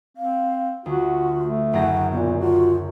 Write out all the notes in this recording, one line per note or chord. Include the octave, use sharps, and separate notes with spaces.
C4 F5
D2 F4 F#4
A3
F#1 F#2 F#5 A#6
A#2 B3
F4 F#4